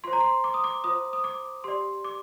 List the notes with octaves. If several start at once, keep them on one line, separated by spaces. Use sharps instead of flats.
F4 C5 C6
A#5
C6
D6
D#6
D6
F4 C5 D#6
D#6
D6
G4 D5 C6
D6